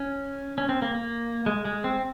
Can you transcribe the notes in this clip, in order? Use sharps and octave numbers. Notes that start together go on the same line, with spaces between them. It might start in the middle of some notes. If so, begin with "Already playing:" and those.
Already playing: C#4
C#4
C4
A#3
A#3
G#3
G#3
C4